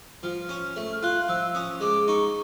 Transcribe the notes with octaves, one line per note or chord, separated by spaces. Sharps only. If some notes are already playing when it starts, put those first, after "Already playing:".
F3 F6
C#4
A3
F6
F4 F#6
F3 E6
C#4 D#6
G#3 D6
D#4 C#6